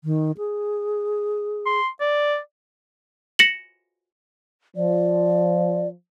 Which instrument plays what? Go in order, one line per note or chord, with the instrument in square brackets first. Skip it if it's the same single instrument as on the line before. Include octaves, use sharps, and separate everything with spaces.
[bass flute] D#3
G#4
[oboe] C6
D5
[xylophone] A#6 C#7 E7 F#7
[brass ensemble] F3 [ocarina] D5